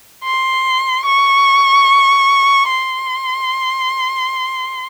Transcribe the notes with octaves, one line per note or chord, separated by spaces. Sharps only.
C6
C#6
C6